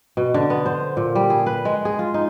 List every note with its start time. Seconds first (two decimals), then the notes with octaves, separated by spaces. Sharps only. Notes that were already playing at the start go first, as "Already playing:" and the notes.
0.17 B2
0.34 D3
0.50 B3
0.66 C5
0.97 A#2
1.15 G3
1.30 G#4
1.46 B4
1.65 G#3
1.85 G#4
1.99 F4
2.14 D#4